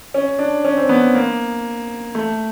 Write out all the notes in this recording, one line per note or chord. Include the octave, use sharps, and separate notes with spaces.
C#4
D4
C#4
C4
B3
A#3
A3